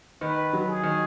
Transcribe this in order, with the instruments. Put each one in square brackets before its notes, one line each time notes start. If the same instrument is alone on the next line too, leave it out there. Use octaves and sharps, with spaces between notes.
[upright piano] D#3 [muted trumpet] B4
[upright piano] F#3
[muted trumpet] G#4
[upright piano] D#3